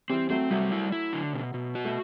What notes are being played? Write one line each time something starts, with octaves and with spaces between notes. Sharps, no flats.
E3 G3 C4
F#3 A3 C4
F#3 G3 A3
E4
E4
D3
B2
B2
F#4
A3